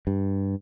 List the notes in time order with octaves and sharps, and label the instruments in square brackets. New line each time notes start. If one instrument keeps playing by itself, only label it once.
[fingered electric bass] G2